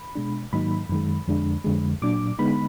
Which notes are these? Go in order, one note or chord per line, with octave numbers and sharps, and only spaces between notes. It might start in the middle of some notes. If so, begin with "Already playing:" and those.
Already playing: B5
B2 G#3 D4
G#2 D#3 F#3 A#3 D#4 B5
F#2 D#3 G#3
F2 D3 G#3 D4
F2 D3 G#3
A#2 F#3 D4 D6
D3 G#3 B3 D#4 B5